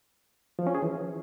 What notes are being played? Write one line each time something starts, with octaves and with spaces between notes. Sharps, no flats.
F3
C#4
G#4
E3